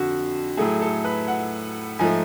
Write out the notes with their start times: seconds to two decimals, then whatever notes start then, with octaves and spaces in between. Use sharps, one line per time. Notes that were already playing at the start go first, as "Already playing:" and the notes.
Already playing: F2 D3 F#4
0.57 A2 F#3 A3 G#4
0.82 A4
1.04 B4
1.28 F#5
1.99 G#2 F3 A3 G#5